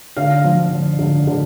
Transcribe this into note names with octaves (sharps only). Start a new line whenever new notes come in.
D3 F5
F3
D3
D3
D3